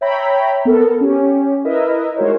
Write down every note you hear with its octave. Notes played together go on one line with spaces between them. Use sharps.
C#5 E5 G5 A#5 B5
B3 A4 A#4
C#4 G4
E4 A#4 B4 D#5 E5
G#3 D#4 F#4 A#4 C5 C#5